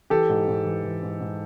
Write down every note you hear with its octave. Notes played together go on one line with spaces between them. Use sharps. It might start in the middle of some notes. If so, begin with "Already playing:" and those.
E3 G4 A4
G#2
G#2
E3
E3
G#2
G#2